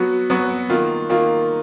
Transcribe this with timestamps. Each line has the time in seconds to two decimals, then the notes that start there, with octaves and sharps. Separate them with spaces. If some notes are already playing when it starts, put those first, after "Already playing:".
Already playing: F#3 B3 F#4
0.30 F#3 B3 F#4
0.70 D#3 A#3 F4
1.09 D#3 A#3 F4